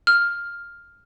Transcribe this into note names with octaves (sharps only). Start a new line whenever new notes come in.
F6